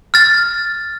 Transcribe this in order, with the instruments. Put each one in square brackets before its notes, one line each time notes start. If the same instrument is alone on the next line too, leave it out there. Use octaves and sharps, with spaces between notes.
[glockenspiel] F6 A6